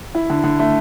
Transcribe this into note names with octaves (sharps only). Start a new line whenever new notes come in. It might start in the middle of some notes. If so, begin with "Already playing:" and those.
E4
D3
D3
A3